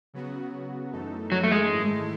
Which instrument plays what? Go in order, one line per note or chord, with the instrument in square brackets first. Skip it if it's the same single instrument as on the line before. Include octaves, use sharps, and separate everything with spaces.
[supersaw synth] C#3 F#3 B3 F#4
F#2 E3 A3 D#4 A4
[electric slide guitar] F#3
A3
G#3
[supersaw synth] G#2 D#3 A3 E4 A4